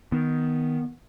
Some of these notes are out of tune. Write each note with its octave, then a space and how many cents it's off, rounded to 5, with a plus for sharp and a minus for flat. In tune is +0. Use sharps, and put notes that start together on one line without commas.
D#3 +5 B3 +0